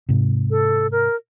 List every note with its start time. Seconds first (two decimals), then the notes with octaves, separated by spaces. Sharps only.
0.09 G#2 C3
0.50 A4
0.92 A#4